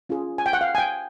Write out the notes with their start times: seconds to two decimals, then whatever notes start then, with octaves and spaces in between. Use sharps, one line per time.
0.09 C#4 F4 G#4
0.38 G#5
0.46 G5
0.53 F#5
0.61 F5
0.75 G#5
0.78 G5